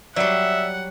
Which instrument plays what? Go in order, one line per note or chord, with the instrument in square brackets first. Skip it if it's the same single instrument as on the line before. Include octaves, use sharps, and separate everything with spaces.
[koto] F#3 G3 [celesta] D5 [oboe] E5 [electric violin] F#5